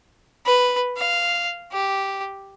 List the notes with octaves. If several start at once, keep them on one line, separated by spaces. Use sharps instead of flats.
B4
F5
G4